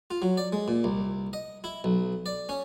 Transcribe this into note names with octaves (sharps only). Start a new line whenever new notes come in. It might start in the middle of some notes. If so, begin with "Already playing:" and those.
F4
F#3
D5
G#3
A#2
C2
D#5
E4
B1
D5
C#4